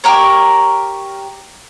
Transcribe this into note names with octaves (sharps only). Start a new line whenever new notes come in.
G4 A#4 C#5